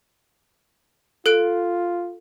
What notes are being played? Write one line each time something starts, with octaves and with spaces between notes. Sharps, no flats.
F4 A4 F#6 D7